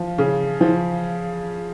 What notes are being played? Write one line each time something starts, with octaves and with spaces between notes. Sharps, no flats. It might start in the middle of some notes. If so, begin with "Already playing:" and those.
Already playing: F3
C#3
F3